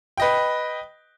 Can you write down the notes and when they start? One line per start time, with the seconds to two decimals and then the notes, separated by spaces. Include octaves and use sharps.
0.17 B4 D#5 G5